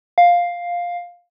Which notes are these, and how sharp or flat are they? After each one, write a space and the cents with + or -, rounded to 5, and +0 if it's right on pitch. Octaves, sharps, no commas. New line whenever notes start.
F5 +5